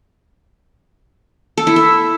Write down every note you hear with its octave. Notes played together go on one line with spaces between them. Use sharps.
A4
E4
E5